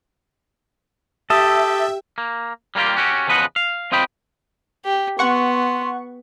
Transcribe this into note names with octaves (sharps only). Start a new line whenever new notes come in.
G4 A4 E5 D#6
A#3
G3 A#3 C4 F4 G4
C#4 F#4 G4
E2 C#3 F3 B4 D#5 F#5
F5
C4 F4 D#5 G5 B5
G4
B3 F#5 C6 C#6